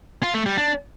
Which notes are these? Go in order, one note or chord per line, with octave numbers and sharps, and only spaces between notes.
F4
A3
G3
D4